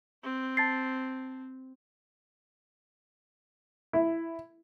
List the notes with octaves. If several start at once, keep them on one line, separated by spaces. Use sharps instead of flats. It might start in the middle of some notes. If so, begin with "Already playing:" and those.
C4
A5 A6 C7
E4